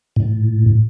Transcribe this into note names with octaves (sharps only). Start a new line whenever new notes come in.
A2